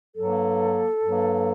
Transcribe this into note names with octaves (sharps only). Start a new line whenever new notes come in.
G2 F#3 A#3 A4
G2 F#3 A#3